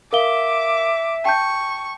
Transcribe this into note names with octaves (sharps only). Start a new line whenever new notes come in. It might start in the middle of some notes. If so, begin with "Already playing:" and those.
A#4 E5 F5 D6 G7
G5 A5 C#6 G6